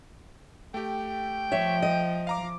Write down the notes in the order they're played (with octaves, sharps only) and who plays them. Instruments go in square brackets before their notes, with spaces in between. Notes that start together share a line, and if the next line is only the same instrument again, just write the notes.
[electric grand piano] A3 G4 [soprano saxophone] G5
[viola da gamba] F3 [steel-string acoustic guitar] C#5 E5
[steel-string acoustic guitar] D#5
[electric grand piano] F5 A#5 D6